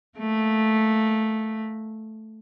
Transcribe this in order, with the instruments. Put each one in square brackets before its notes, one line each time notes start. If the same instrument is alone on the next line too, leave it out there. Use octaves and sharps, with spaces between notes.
[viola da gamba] A3 A#3